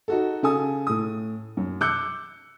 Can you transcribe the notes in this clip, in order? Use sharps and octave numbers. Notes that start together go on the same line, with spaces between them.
D#4 F#4 A4
C#3 A4 G#5 D#6
A2 D#6
F#2
D6 E6 F#6 G6 C#7